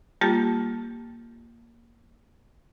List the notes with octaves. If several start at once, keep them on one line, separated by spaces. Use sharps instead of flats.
G3 A#3 F4 G4 A5 A6